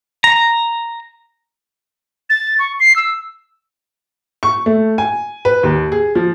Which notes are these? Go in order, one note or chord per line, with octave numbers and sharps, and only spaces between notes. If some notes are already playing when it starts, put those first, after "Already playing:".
A#5
A6
C#6
C7
E6
C#6
A3
G#5
B4
D#2
G#4
F3